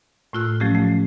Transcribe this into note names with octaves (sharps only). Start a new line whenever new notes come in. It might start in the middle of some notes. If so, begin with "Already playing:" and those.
A2 A3 F4 E6 F#6
F3 F#3 A3 C#4 G4
A3